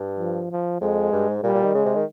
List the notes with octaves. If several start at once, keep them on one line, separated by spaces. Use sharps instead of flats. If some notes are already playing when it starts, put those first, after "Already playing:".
Already playing: G2
F3
F3
F2 G#3
G2
G#2
A#2 G3
A#2
D#3
C#3 G#3
C3
D#3